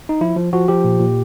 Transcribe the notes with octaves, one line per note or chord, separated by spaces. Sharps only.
D#4
F3 E4
F3
F3 F#4
F3 G4
A#2
A#2